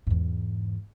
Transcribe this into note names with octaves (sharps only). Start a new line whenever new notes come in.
E2 G#2